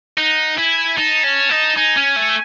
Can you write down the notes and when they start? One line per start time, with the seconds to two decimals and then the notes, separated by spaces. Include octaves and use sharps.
0.18 D#4 F#5
0.57 E4 G#5
0.98 D#4 A5
1.25 C#4
1.51 D#4
1.76 D#4 G#5
1.96 C#4
2.16 A3